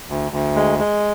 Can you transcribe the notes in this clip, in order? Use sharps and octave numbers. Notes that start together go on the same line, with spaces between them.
D2
D2
G#3
G#3